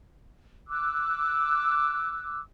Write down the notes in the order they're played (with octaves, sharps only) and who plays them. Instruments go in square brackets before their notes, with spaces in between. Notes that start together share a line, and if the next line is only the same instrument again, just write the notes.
[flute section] D6 E6 F#6